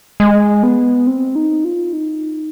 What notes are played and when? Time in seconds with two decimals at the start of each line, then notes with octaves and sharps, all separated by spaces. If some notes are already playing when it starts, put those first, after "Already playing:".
0.20 G#3
0.63 B3
1.07 C4
1.35 D#4
1.64 F4
1.93 D#4